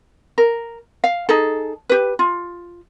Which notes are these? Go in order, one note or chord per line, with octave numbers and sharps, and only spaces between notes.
A#4
F5
D#4 G#4 A4
G4 B4
F4